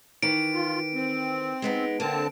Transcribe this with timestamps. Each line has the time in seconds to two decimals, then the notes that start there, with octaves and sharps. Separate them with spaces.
0.22 D#3 E3 D7
0.53 F4
0.94 C4
1.62 G#3 B3 D#4
2.00 D3 A#3 C4 A5